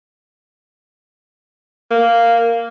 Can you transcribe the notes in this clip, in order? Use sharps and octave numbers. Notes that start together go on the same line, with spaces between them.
A#3